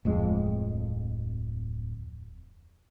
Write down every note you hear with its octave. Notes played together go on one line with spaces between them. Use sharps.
D1 F2 G#3